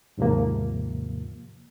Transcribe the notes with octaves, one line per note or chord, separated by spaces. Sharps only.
D#2 G#2 C3 F3 A#3